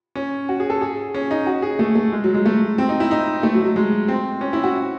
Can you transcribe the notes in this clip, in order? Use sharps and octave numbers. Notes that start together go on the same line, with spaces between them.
C#4
F#4
G#4
A4
G#4
C#4
D#4
F#4
G#4
A3
A3
G#3
F#3
G#3
A3
C4
D#4
E4
D#4
A3
F#3
F#3
G#3
C4
C#4
E4
F#4